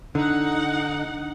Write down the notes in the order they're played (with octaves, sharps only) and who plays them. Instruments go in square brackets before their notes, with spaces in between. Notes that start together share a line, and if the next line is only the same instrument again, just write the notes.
[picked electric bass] D3 [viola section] D#4 F#5